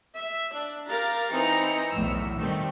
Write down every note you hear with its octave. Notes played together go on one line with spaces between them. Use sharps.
E5
D4
G4 A#4 F5 A#5 A6
E3 C4 D#4 A#5 C#7
B1 E2 A2 E6
D#3 G3 A3 C4